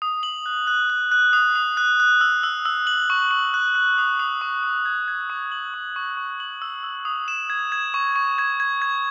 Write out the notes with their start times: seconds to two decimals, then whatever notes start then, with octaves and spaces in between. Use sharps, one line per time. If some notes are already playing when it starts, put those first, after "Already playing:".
0.02 D#6
0.23 F#7
0.46 F#6
0.67 F#6
0.90 F#6
1.12 F#6
1.33 D#6
1.55 D#6
1.77 F#6
2.00 F#6
2.21 E6
2.43 E6
2.66 E6
2.87 F#7
3.10 C#6
3.31 C#6
3.54 F#6
3.75 F#6
3.98 D#6
4.19 D#6
4.41 C#6
4.63 C#6
4.85 G#6
5.08 G#6
5.30 C#6
5.52 F#7
5.74 C#6
5.96 C#6
6.17 C#6
6.40 F#7
6.62 E6
6.83 E6
7.05 D#6
7.28 E7
7.50 G#6
7.72 G#6
7.94 C#6
8.16 C#6
8.38 G#6
8.60 G#6
8.82 G#6